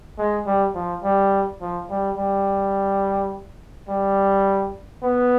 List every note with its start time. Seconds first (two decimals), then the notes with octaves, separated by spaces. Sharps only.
0.18 G#3
0.46 G3
0.75 F3
1.03 G3
1.61 F3
1.90 G3
2.17 G3
3.89 G3
5.03 B3